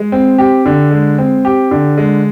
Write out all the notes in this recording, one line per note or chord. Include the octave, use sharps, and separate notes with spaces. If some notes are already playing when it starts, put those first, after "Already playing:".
Already playing: G#3
C4
G4
D3
G#3
C4
G4
D3
G#3